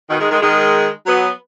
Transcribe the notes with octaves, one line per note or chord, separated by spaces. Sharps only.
B2 D#3
D#3 G#3
D#3 G#3
D#3 G#3
F#3 B3